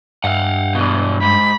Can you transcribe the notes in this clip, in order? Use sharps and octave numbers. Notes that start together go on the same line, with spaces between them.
G2 F5 F#5
B2 E3
G#2 B5